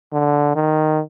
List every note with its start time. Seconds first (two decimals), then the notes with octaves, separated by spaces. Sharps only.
0.13 D3
0.55 D#3